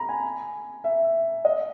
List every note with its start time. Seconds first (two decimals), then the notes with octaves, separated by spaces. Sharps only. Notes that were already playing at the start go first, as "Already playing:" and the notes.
Already playing: A#5 B5
0.09 G#5
0.84 E5
1.45 D#5